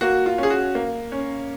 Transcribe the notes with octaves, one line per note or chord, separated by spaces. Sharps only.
A#3 F#4
F4
C#4 G#4
F#4
A#3
C#4